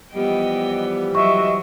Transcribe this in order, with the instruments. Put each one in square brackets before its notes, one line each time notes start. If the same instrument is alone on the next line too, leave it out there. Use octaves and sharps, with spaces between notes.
[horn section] E3 F3 G3 [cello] B3 G5 [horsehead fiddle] D#5
[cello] F#3 [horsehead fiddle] D#5 E5 [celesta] C#6